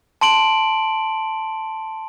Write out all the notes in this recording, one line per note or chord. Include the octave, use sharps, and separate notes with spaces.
A5 C6 D7 F#7